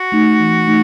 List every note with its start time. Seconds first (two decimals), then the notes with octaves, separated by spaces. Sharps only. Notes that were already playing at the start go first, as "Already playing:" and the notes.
Already playing: F#4
0.12 A3 D#4
0.39 E3
0.67 A3 D#4